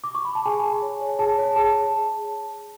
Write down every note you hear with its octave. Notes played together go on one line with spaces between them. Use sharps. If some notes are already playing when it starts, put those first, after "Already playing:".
D6
C#6
B5
A5
G#4 G#5
G#4
C#5
C#5
G#4 A5
C#5
G#4 A5